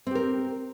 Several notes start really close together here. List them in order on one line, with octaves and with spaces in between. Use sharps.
C4 G4 A#4